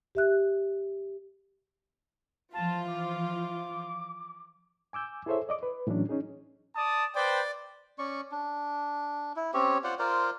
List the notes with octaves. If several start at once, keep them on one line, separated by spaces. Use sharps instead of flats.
G4 E5 F#6
E3 F3 F4 A5
D6
G#5 D6 E6 G6
E4 G#4 A4 C5 C#5 E5
D5 D#5 D6
B4
A2 E3 F#3 C#4 D4
C#4 D#4 G#4
D5 A5 D#6
B4 C5 D5 G5
C#4 D5 C#6
D4
E4
C4 C#4 G4 C#5
F4 C5 D5 F#5
F4 A#4 C5 D5